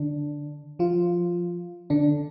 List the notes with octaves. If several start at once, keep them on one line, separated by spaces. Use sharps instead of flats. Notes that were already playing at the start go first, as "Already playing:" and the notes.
Already playing: D3 D4
F3 F4
D3 D4